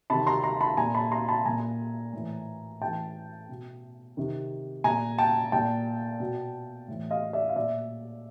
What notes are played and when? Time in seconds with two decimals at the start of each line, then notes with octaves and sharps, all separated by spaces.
0.10 C3 D#3 A5 B5
0.27 A#5 C6
0.43 A#5 C6
0.60 A5 B5
0.77 A#2 G#5 A#5
0.95 A5 B5
1.12 A#5 C6
1.29 A5 B5
1.45 A#2 G#5 A#5
2.13 A2 E3
2.81 A2 E3 G5 A5
3.49 B2
4.17 C3 D#3
4.84 A#2 G#5 A#5
5.18 G5 A5
5.52 A#2 G5 A5
6.20 B2
6.88 A2 E3
7.11 D#5 F5
7.33 D5 E5
7.49 F5
7.56 A#2 D5 E5